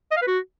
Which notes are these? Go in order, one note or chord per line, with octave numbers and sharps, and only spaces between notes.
D#5
F5
B4
F#4